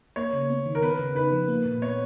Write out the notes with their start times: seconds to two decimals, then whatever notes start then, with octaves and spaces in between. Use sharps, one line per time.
0.16 A#3 C#5
0.33 C#3
0.50 B3
0.66 D#3
0.75 A#4
0.83 B3 B4
0.99 C#3
1.15 D#4 B4
1.32 F3
1.48 A#3
1.65 A#2
1.82 B3 C#5